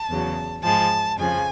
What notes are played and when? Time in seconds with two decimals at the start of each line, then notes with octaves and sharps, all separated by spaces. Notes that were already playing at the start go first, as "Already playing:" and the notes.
Already playing: A5
0.10 E2 C#3 F#3
0.63 G#2 F3 G#3 A5
1.17 F2 C#3 F3 G#5